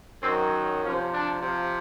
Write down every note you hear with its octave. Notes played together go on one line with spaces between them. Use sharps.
F#2 D#3 F#3 C4
C3 F3 C#4
D4
C3 F3